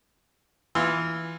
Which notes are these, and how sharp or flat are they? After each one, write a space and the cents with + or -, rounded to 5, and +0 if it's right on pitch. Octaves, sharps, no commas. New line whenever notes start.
E3 +0 F4 +0 C6 +0